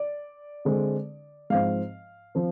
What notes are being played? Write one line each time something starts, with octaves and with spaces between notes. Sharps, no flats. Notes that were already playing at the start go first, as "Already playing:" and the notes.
Already playing: D5
D3 G#3 C4
G#2 F3 C4 F5
F3 C4